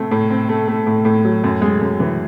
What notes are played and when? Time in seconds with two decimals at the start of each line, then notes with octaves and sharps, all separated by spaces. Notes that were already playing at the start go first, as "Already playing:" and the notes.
Already playing: A2 A3 C4
0.11 A2
0.30 C4
0.49 A3
0.68 A3
0.87 A2
1.05 A2
1.25 F#3
1.44 F#2
1.62 G#3
1.81 F#2
2.00 E3